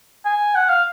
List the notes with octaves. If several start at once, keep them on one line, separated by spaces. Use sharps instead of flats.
G#5
F#5
F5